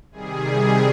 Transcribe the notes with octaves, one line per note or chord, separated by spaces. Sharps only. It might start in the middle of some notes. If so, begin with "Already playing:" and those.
C3 D#3 G3 G#4